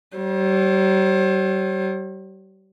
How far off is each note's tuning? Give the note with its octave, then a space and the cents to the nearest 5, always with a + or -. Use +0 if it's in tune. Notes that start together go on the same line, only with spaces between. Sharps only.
G3 -40 C5 +35